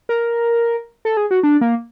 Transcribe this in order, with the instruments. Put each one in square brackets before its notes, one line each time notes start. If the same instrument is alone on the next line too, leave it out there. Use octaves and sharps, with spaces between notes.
[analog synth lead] A#4
A4
G#4
F#4
D4
A#3